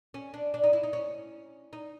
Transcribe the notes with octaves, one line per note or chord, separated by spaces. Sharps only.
C#4
D4
D4
D#4
E4
D#4
C#4
D#4